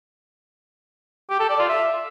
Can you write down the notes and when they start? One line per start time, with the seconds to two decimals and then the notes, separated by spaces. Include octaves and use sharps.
1.30 G4
1.40 A4
1.49 D5
1.59 F4
1.69 E5